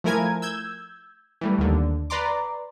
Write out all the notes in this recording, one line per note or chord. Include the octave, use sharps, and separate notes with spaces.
F3 A3 E4 A#4 G#5 G#6
E6 G6 G#6
E3 G3 A3
D#2 D3
B4 D5 A#5 C6 D6